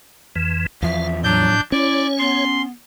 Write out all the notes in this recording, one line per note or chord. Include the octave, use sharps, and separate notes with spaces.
F2 E3
E2 F3 E5 F5
A2 F#3 D4 G6
C#4 E4 C#5 D5
B3 C6